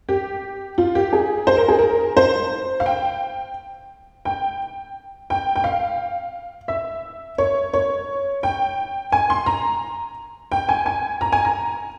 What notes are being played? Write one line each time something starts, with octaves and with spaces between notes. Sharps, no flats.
G4
F4
G4
G#4
C5
A#4
G#4
A#4
C5
F5
G5
G5
G5
G5
F5
E5
C#5
C#5
G5
G#5
C6
A#5
G5
G#5
G#5
A#5
G#5
A#5